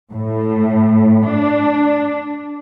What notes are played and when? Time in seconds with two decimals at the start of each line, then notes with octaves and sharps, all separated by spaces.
0.13 A2
1.28 D4